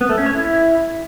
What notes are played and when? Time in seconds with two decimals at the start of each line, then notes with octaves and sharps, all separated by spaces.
0.01 B3
0.09 A3
0.18 C#4
0.26 C#5
0.35 E4